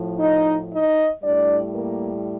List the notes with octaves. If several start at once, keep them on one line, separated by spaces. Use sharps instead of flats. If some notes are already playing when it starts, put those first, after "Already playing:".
Already playing: A2 F3
D#4 D#5
D#4 D#5
A2 G3 D4 D5
A#3 A#4